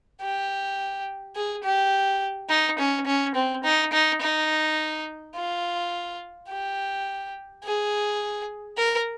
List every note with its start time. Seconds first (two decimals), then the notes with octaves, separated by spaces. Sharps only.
0.21 G4
1.35 G#4
1.64 G4
2.49 D#4
2.79 C#4
3.06 C#4
3.35 C4
3.64 D#4
3.93 D#4
4.21 D#4
5.35 F4
6.49 G4
7.63 G#4
8.77 A#4